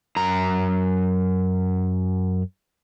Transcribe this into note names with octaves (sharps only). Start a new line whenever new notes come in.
F#2 A#5